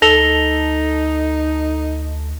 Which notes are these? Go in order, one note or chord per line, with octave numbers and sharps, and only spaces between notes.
D2 D#4 A4 A#6 F7 G7